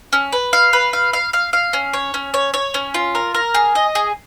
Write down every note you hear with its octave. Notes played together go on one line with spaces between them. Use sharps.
C#4
B4
F5
B4
F5
F5
F5
F5
C#4
C#5
C#4
C#5
C#5
C#4
F4
A#4
A#4
G#4
D#5
G#4